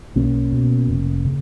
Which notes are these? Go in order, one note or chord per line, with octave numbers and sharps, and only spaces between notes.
B1 A#3 C#4
B2
F1
C#3